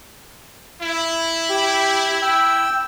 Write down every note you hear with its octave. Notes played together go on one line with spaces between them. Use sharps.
E4
G4
G5 E6